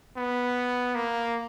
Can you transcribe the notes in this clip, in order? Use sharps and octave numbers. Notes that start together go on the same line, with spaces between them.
B3
A#3